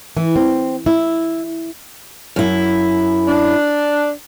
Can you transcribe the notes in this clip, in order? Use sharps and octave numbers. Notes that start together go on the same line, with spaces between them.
E3
C4
E4
F#2 E4
D4